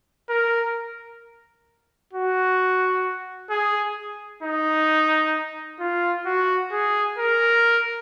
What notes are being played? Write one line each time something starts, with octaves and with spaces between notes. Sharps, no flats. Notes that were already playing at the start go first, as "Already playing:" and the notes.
A#4
F#4
G#4
D#4
F4
F#4
G#4
A#4